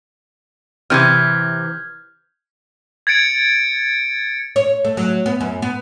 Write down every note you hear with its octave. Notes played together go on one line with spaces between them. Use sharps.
C3 E3 F6 G6 G#6
G#6 A6 C#7 D7
C#5
A3
F#3
B3
F#2
B3